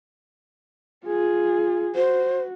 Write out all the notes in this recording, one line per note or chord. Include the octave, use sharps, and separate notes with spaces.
F4 G#4
F#4 C5